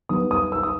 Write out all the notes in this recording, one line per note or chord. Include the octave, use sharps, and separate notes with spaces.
D#3 G3 B3 D#6
D#6
E6
D#6